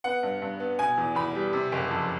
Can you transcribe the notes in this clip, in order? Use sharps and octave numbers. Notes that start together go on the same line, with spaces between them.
B3 F#5
G2
G2
B3
B2 G#5
E2
E2 B5
G3
C3
F#1
F2